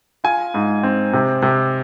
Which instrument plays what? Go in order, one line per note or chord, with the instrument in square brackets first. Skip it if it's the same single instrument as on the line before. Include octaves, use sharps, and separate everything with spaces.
[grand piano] F4 G#5
G#2
C4
C3
C3